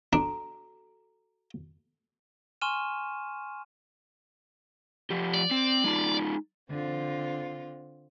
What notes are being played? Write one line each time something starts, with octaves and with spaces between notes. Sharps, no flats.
D4 F#4 A4 A#5
G#5 C6 C#6 F6 D#7 E7
F3 G4
D5
C4
G#3 D#4 F4
D3 C4 F4